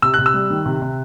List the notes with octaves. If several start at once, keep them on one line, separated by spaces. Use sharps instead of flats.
C3 E6
C3 F#6
E6
G3
D#3
C3
C3